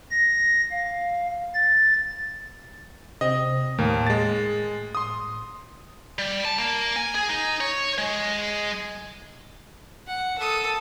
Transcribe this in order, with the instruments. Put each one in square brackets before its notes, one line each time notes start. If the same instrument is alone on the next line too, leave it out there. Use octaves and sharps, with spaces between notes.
[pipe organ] A#6
F5
A6
[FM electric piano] C3 C4 [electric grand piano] D#5
[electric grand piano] D#2 A#3 [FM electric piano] A2
[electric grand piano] G#3 A6
C6 D#6
[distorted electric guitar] G3
A5
A#3
G#5
G#4
D#4
C#5
G#3
[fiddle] F#5
A4 D#6